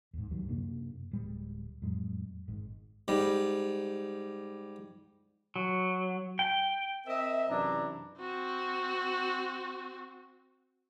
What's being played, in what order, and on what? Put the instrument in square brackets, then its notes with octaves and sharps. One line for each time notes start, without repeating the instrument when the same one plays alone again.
[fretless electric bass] D#2 G#2
C#2 G2 D#3 F#3
F#2 C3 A#3 D4
D1 G3 G#3
F2 A2 F#3 G#3
G#1 G#2 G#3
[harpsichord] G#2 G3
[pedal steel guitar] F#3
G5
[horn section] C4 A#4 D#5 E5
F#2 C3 E3 D4 E4 A#5
[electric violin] C4 F#4